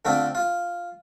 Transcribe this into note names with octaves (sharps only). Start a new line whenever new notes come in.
D3 A3 C4 F4
F4